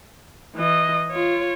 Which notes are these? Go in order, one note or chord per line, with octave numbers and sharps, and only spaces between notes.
E3 D#5
F4 C#5